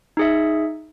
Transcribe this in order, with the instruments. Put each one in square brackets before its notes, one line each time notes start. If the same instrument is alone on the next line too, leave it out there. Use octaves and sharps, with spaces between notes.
[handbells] D#4 G#4 E5